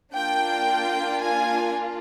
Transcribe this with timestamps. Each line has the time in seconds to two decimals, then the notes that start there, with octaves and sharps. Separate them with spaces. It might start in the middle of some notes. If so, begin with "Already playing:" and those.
0.14 A#3 D4 F4 G5
1.21 G#5